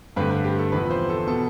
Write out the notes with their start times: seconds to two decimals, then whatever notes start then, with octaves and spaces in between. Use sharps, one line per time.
0.16 G2 D3 A3 C4 B4
0.31 B4
0.44 G4
0.59 A4
0.72 E2 C3 F3 B3 B4
0.91 C5
1.09 A4
1.27 B2 B3 A4